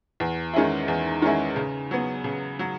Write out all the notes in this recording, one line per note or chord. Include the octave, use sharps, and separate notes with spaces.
E2
D#3 G#3 C#4 E4
E2
D#3 G#3 C#4 E4
C#3
F#3 B3
C#3
F#3